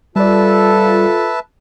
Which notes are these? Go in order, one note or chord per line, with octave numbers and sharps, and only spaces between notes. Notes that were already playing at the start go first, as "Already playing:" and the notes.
G3 F4 A4 B4 D5 E5 A5